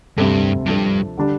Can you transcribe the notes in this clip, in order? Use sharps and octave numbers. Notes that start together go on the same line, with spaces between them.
D2 G2 C3 G3 C4 A4
G2 F3 D4 A4
D3 G3 D4